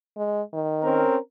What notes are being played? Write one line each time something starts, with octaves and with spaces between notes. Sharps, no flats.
G#3
D#3
C4 C#4 A#4